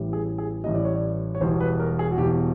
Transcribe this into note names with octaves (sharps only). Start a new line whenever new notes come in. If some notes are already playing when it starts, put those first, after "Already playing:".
Already playing: A1 A2 E3 G3
G#4
G#4
A1 A2 E3 G3 D#5
D5
C#5
D5
C#5
E1 E2 B2 G3 C5
B4
A#4
G#4
F#4
E1 E2 B2 G3 G4